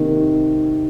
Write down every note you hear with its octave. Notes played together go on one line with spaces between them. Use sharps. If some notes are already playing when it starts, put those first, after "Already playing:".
Already playing: C3 D#3 A#3